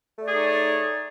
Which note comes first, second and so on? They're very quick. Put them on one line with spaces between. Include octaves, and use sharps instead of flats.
A3 D5 G#4 D#4 C#5